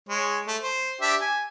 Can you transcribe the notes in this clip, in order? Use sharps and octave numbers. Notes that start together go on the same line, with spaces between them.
G#3 C#5
A3
C5
D4 G4 E5
G#5